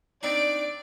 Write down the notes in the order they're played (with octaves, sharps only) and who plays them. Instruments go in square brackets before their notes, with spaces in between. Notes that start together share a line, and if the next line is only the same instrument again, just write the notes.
[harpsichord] C4 D4 D#4 [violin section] D5 D7